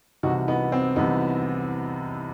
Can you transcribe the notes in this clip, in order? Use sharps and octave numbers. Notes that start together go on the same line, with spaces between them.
C2 C3 E3 D#4 F#4
B3 D#4
C4
C2 C3 E3 B3 D#4